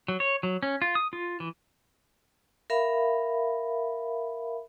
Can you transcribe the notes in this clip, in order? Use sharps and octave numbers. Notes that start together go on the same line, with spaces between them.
F#3
C#5
F#3
C#4
F4
D#6
F4
E3
A#4 E5 F5 B5